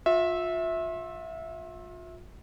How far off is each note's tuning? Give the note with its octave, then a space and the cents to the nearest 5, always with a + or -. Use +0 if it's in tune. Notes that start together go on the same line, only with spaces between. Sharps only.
F4 +35 E5 -10